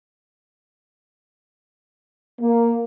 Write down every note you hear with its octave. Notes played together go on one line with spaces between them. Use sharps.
A#3